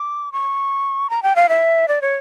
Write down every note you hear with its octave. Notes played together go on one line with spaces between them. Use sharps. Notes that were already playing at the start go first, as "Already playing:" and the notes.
Already playing: D6
C#6
A#5
G5
F5
E5
D5
C#5